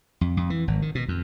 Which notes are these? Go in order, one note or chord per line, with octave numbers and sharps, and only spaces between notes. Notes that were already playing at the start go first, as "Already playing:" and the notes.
F2
F2
E3
G#1
D#3
B2
F2